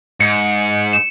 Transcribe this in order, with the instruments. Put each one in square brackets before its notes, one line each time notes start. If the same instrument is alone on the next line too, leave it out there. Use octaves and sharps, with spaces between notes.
[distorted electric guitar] G#2 [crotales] C#7
[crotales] E7